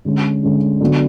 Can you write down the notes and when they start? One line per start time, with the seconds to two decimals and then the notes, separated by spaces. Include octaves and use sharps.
0.05 D3 G#3 C#4
0.43 D3 G#3 C#4
0.81 D3 F#3 B3 D4